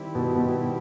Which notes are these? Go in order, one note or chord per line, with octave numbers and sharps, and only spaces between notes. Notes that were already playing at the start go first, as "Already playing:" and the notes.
Already playing: D#3 G3 C4 E4 G4
B2
B2